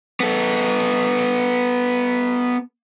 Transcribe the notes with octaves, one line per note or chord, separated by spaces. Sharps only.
B3 A4